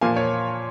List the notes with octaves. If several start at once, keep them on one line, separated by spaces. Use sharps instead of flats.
A#2 F3 A#3 F5 G#5
C#5